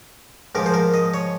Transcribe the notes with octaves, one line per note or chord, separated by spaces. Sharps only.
G#2 F3 A#4
C5
A#4
D#5
C#5